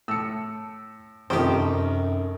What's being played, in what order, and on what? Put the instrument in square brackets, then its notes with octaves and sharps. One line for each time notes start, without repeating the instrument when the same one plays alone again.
[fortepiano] A2 [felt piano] E6 C#7
[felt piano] F1 C4 [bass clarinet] F#2 [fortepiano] D#3 F3 [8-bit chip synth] G4 C5